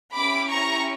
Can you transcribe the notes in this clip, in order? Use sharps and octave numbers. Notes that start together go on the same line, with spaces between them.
C#4 E4 G4 B5 D6
A#5 C#6